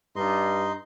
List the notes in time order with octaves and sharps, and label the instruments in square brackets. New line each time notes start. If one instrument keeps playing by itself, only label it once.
[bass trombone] G2 [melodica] D#4 D#5 C6